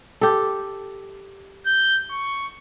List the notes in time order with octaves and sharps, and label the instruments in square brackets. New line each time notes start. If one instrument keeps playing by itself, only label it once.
[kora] G4 A4
[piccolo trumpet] G6
C#6